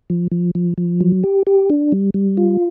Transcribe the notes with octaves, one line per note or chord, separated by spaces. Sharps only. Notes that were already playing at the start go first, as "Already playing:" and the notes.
F3
F3
F3
F3
F#3
G4
G4
D4
G3
G3
F4